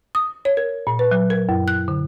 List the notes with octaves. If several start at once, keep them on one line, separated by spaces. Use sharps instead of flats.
D#6
C#5
A#4
A#2
B4
F#3
A#4
F#2
F#6
D3